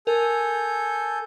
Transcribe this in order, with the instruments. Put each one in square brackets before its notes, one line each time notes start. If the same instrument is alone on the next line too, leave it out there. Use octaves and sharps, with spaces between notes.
[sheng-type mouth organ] A4 G#5 G6 [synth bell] A#4